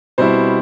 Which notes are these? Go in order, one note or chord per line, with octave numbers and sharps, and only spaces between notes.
B2 G3 C4 E4 C5